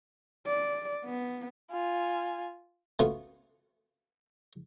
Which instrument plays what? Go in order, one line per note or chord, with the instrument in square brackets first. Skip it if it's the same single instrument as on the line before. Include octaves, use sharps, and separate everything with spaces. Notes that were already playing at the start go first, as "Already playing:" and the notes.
[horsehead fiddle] D5
B3
[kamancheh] F4 G#5
[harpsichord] A3 B3 C#4 F4 F#4